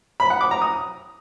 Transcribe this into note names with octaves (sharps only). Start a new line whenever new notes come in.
B5
F#5
D6
A#5
D#6